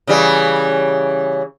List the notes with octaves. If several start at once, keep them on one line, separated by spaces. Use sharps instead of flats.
C#3 E3 G3